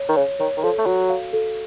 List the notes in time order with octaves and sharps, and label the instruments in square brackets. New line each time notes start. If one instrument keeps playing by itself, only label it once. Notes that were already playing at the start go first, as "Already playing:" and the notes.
Already playing: [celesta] C#5
[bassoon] D#3
[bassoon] C#3 [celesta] C#5
[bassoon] D#3 [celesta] C#5
[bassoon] D#3
[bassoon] F3 [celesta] A4
[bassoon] A3
[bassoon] F#3 [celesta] F#4
[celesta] F5
A4